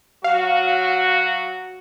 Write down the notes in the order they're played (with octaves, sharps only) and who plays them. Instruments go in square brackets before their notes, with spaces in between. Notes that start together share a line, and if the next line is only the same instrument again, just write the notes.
[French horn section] F#3 F#4 [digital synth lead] F5